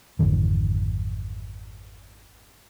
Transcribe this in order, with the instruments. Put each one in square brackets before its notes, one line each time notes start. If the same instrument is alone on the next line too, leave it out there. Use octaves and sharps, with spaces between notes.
[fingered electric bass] G#1 F2 D3 E3